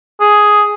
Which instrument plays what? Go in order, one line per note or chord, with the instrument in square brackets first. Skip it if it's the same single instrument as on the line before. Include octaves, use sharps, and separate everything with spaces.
[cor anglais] G#4